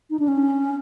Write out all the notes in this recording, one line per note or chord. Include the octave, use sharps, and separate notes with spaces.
D#4
D4
C#4